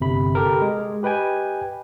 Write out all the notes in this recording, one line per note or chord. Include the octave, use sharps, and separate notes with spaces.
G1 C3 B5
G4 A4 A#4
G#3
G4 B4 D#5 G5 G#5